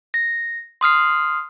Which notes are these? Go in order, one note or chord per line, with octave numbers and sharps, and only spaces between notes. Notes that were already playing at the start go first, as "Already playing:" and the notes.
A#6
C6 D#6 F6 C7